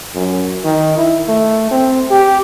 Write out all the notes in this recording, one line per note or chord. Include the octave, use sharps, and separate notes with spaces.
F#2
D#3
E4
A3
C4
G4